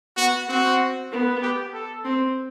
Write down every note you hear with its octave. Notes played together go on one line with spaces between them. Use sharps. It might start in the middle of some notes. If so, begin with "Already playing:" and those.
B3 F#4
C4 F#4
B3
G4
A4
C4